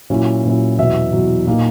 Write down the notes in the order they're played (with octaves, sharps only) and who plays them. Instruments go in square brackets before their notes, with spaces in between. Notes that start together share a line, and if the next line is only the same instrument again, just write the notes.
[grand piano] A#2 F#3 C#4 E4
A#2 F#3 C#4 E4
E2 B2 F#3 E5
E2 B2 F#3
A#2 A#3 D#4